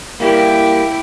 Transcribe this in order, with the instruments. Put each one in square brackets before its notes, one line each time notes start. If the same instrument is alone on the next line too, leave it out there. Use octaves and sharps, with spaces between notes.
[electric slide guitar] G3 A#3 [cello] E4 G4